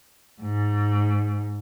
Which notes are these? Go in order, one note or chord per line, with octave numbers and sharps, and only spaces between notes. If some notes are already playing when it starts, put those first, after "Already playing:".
G#2